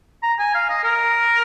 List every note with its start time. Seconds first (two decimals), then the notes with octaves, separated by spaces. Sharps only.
0.22 A#5
0.39 G#5
0.54 F5
0.69 D#5
0.84 A#4